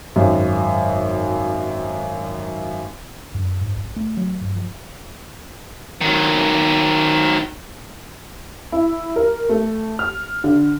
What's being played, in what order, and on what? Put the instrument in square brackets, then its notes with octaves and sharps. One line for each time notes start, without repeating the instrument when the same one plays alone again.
[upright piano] G#1 F#2
[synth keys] F#2
G#2
A#1
A3
F#3
G2
F3
[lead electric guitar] D#3 F#3
[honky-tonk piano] E4
A#4
A3
F6
D3